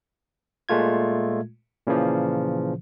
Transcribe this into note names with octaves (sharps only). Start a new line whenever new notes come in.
A#2 G#3 A3 F4 G#6
A#2 C#3 E3 F3